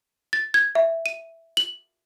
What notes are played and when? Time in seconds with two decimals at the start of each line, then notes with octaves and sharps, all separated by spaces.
0.33 A6
0.54 G#6
0.75 E5
1.06 D#7
1.57 F#7